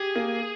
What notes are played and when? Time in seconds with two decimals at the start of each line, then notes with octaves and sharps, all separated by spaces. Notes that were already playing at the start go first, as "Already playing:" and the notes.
Already playing: G4 G#4
0.16 A#3